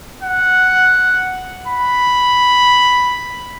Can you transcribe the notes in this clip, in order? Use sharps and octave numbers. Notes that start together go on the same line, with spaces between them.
F#5
B5